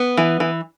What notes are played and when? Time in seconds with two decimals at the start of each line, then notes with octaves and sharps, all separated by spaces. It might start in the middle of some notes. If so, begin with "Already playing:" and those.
Already playing: B3
0.17 E3
0.40 E3